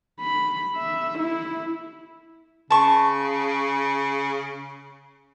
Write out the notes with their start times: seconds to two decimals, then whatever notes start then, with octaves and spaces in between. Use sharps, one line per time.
0.21 B5
0.76 E5
1.19 E4
2.70 C#3 A5 C#6